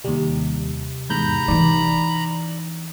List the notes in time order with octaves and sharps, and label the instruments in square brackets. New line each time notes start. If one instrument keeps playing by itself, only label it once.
[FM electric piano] D#2 G3 [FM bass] C3
[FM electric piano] E2 G#2 G6 [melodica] A#5 B5
[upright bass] E3 D#4 [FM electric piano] D5